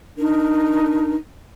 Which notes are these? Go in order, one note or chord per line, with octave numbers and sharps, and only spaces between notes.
D4 D#4 A#4